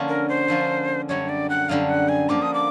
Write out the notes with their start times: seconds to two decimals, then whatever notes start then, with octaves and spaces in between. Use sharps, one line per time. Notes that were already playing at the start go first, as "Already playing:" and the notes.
Already playing: D3 F3 A#3 C#4 F4
0.08 A#4
0.29 C5
0.48 D3 F3 A#3 C#4 F4
1.09 F#2 D3 G3 C#5
1.29 D5
1.50 F#5
1.69 F#2 D3 G3 F5
1.89 F#5
2.09 G#5
2.29 D3 F3 A#3 D6
2.42 D#6
2.54 D6